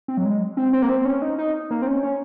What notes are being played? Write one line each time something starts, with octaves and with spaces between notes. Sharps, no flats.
C4
F#3
G#3
C4
C4
A#3
C4
C#4
D#4
D#4
A#3
C4
C#4
C#4